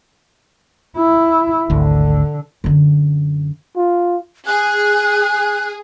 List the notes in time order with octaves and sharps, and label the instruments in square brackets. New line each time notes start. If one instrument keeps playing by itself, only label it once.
[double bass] E4
[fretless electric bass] G#1 D2 [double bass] D3
[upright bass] F#2 D3
[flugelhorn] F4
[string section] G#4 [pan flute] F#6